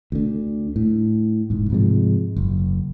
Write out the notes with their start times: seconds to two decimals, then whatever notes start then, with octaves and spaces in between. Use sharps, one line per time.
0.12 D2 D3
0.76 A2
1.50 E1 G#2
1.70 G#2 C3 F3 G#3
2.36 F#1